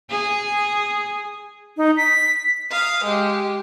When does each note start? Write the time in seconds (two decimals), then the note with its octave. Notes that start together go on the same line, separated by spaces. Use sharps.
0.11 G#4
1.77 D#4
1.97 B6
2.70 F5 D#6
3.04 G#3 G4